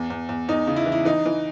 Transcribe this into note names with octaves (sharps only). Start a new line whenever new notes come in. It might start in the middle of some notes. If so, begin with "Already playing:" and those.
Already playing: E2
E2
E2
E2 D#4
C#3
E4
E3
E4
E3 D#4
E3